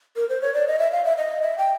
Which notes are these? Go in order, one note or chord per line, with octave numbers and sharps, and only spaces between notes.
A#4
C5
C#5
D5
D#5
E5
F5
E5
D#5
E5
G5